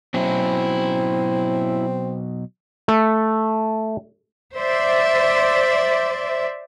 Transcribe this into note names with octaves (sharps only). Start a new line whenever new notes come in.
B2 F#3 C4 C#4 E4
A3
C5 D5 E5